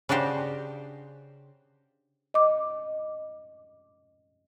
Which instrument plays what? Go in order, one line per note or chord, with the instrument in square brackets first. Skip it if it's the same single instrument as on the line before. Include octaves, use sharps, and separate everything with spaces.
[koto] C#3 D4 F#4 G4 C5
[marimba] D#5 D6